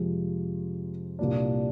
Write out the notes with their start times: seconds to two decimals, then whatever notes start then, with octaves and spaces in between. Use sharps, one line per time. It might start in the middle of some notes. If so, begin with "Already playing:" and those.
Already playing: F2 C3 F3 G#3
1.19 C2 A#2 G3 A#3 D4